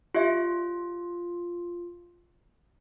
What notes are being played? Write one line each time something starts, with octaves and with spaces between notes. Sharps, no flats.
F4 G4 D5 E5